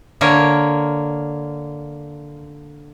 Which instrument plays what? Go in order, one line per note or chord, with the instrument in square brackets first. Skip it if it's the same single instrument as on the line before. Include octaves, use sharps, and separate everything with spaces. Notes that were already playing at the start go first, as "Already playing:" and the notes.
[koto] D3 A#3 A#4 C#5